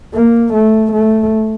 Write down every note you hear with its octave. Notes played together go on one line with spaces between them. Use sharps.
A#3
A3
A3